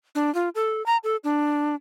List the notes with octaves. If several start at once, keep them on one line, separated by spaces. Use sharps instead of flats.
D4
F4
A4
A#5
A4
D4